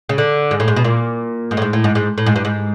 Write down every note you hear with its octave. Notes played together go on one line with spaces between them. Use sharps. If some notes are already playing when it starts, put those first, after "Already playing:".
C#3
D3
G#2
A2
G#2
B2
A#2
G#2
A2
G#2
A2
G#2
G#2
A2
G#2
G2
G#2